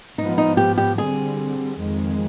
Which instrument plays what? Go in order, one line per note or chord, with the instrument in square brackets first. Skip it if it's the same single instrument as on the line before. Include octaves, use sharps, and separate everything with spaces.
[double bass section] G#2 F3 B3 [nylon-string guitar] D#4
[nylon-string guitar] D#4
G4
G4
[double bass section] D3 G3 C4 [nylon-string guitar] G#4
[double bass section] F2 D#3 G#3